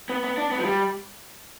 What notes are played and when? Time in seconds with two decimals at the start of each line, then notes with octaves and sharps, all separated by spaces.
0.09 B3
0.24 B3
0.38 D4
0.51 B3
0.59 F3
0.65 G3